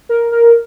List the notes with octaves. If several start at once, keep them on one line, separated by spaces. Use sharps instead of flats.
A#4
A#4